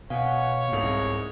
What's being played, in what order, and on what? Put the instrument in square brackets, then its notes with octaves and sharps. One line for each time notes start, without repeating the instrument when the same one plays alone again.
[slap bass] B2 [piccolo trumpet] C#5 [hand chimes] F5 [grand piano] F#5 G#5
[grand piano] C2 C3 F7 [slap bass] G#2